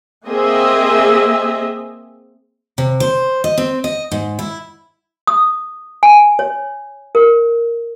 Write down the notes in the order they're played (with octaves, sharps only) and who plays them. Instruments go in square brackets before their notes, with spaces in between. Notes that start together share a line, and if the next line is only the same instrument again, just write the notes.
[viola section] A#3 C4 G#4 D#5 E5
[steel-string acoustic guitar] C3
C5
D#5
C4
D#5
G#2
E4
[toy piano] D#6
G#5
C#5
A#4